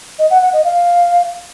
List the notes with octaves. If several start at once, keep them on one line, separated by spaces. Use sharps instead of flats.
D#5
F#5
F#5
D#5
F5